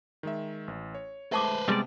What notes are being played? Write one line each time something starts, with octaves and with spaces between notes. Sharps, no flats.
D#3 G#3 E5
A1
C#5
G#3 A3 B4 C5 E5 A5 D6
C3 G3 G#3 B3 D5